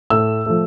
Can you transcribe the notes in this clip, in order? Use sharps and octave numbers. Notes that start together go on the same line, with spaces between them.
A2 E6
F3 A3